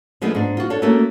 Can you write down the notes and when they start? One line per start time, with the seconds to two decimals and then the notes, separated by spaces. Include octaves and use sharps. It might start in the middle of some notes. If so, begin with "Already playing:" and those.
0.21 F3 G#3 A3 B3 D4 G#4
0.35 G#2 D4
0.57 F4 F#4
0.70 D4 A4 C#5
0.82 A3 A#3 C#4 F#4 A4